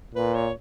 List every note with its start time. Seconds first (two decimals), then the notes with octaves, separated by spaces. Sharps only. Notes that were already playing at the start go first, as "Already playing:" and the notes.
0.15 A#2 B4
0.35 C#5